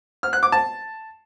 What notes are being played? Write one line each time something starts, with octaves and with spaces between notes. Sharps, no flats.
F6
F#6
D6
A5